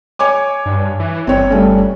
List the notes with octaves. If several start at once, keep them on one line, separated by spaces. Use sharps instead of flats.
C#5 G#5 D6
G2
E3
G1 C4 C#5
G3 A3 C#4